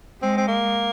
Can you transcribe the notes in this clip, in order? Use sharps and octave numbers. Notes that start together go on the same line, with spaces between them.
G#3 C4
C4
A#3